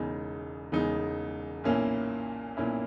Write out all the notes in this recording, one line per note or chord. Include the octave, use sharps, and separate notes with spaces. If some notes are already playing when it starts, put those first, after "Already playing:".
Already playing: E1 E2 C#3 G#3 D#4
E1 E2 C#3 G#3 D#4
B1 A#2 A#3 C#4 E4
B1 A#2 A#3 C#4 E4